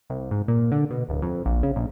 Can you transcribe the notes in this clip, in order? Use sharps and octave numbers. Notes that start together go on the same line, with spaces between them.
C2
G#2
A#2
D3
B2
D1
F2
A#1
C#3
A#1